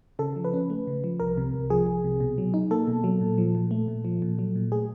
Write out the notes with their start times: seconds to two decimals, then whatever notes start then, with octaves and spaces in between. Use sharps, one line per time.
0.19 C#3 A4
0.36 F3
0.44 B4
0.53 C#4
0.70 A3
0.87 C#3
1.04 F3
1.20 C2 A#4
1.37 C3
1.54 C2
1.70 F3 G#4
1.86 C2
2.04 C3
2.20 B2
2.38 F#3
2.54 D#4
2.71 A#3 A4
2.87 B2
3.04 F#3
3.21 A#2
3.38 F3
3.55 A#2
3.71 A3
3.88 A#2
4.05 F3
4.22 A#2
4.39 F#3
4.55 A#2
4.72 A3 G#4